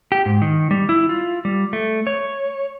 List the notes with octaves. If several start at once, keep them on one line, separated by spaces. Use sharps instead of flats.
G4
G#2
D#3
G3
E4
F4
G3
A3
C#5